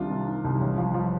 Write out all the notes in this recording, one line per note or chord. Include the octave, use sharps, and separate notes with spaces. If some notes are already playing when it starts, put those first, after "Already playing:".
Already playing: C2 C3 D#3 D4 F4
C3
D#3
C2
A1
F3
F3